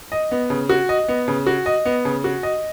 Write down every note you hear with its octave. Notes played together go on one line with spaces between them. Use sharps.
D#5
B3
C#3
F#4
D#5
B3
C#3
F#4
D#5
B3
C#3
F#4
D#5